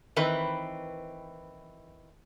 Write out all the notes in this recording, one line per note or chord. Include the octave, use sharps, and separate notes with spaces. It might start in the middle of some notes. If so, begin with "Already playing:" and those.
D#3 E3 C4 B4